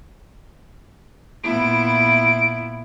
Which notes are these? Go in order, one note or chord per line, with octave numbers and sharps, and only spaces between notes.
A#2 B3 E4 D7